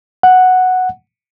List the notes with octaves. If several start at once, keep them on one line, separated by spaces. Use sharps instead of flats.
F#5